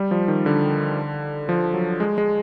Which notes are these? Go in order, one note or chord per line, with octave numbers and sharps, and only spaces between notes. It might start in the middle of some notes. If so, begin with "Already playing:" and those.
Already playing: G3
F3
D#3
D3
F3
F#3
G#3
G#3